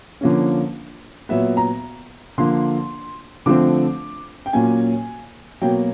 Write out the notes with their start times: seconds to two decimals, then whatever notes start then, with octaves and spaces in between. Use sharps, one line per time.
0.21 D3 F3 A#3 C#4
1.29 A#2 F#3 B3 E5
1.57 A#5
2.38 D3 F3 A#3 C6
3.46 D3 F3 A3 C4 D6
4.46 G5
4.53 A#2 F#3 A#3 C#4 G#5
5.62 B2 F#3 A#3 G5